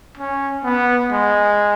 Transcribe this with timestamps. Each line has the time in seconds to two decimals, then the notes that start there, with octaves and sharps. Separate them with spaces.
0.17 C#4
0.64 B3
1.12 G#3